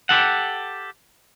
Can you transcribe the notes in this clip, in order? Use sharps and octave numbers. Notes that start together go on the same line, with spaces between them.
G4 A4 F#5